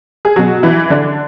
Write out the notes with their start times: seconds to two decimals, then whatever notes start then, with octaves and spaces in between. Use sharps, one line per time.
0.25 G#4
0.36 B2 F#3 F#4
0.63 E3 E4
0.90 D3 D4